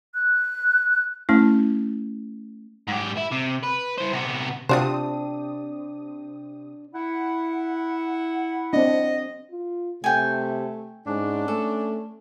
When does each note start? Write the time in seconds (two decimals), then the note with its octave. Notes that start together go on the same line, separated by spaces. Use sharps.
0.14 F#6
1.29 A3 C#4 E4
2.88 G#2 G4
3.17 E4
3.32 C3
3.64 B4
3.98 E4 C5
4.13 C3 B3
4.69 C3 C4 D4 F4 F#4 C5 D#6
6.94 E4 F#5
8.73 C4 D4 D#5
9.51 F4
10.04 C3 A3 G5 G#5
11.07 G#2 C#4 D4
11.48 A3 A4